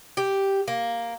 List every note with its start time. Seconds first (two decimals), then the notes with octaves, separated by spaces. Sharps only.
0.17 G4
0.68 A#3